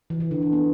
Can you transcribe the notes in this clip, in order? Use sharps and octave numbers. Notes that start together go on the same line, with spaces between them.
E3
E3
D3
E3
B3